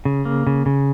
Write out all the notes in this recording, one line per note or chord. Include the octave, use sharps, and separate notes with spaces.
C#3
A#3
C#3
C#3